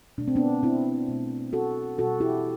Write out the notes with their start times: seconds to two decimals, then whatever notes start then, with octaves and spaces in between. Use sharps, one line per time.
0.18 B2 A3 D4
0.28 C4
0.35 B3 D4
0.63 C4 E4
1.08 B2 A3
1.53 F#4 A4
1.98 B2 G3 F#4 A4
2.20 E4 G4